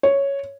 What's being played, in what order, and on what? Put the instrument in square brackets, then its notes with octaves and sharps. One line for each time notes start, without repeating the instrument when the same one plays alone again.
[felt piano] C#5